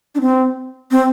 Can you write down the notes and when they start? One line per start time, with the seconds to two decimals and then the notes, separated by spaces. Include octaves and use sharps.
0.15 D4
0.21 C4
0.91 C4